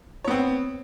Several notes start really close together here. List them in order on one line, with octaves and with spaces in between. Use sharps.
C#5 B3 C4